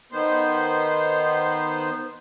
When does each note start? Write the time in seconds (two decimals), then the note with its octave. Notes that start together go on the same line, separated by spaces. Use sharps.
0.12 D#3 B3 C5